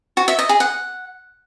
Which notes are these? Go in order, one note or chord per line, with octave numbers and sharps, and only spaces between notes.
F#4
E5
D#5
G#4
F#5